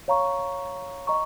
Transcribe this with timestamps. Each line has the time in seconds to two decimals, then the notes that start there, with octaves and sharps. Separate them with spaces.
0.08 C#5 F5 A#5 C#6
1.07 D#5 A#5 C#6